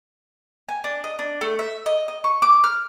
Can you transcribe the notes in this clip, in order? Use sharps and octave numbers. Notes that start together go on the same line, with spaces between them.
G#5
D4
D#5
D4
A3
E5
D#5
D#5
C#6
D6
F6